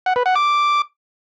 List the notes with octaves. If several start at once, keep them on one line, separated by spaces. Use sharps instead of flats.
F#5
B4
F#5
D6